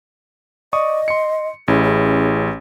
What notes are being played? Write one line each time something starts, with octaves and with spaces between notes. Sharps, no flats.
D5 D#5 C#6 D#6
C6 C#7
A1 C#4 E4 G#4
G#4